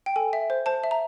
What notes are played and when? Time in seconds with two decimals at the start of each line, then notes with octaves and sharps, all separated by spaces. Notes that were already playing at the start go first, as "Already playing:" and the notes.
0.06 G5
0.16 A4 G#5
0.33 E5
0.50 C5
0.66 C5 A5
0.84 E5
0.91 A#5